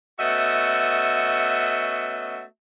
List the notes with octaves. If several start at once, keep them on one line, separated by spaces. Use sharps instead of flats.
A3 B3 C#4 F#4 D#5 E5